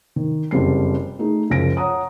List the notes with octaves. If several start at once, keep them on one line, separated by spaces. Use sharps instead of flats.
D#3
F#1 F2 G3 C7
A3 D#4 G#4
F#1 C#2 F#2 F3 A#6 D7
C#5 F#5 A#5 D#6